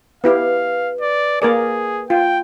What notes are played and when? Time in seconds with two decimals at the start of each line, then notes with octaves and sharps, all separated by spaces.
0.24 B3 E4 G4 B4 F5
1.01 D5
1.42 A#3 G#4 A#4 D5
2.10 F4 G5